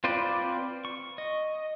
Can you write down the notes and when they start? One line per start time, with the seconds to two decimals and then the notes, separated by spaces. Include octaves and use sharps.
0.04 C4 F4 B4 C5 D5
0.85 C#6
1.18 D#5